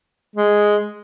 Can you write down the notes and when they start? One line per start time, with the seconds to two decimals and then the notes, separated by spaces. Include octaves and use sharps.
0.36 G#3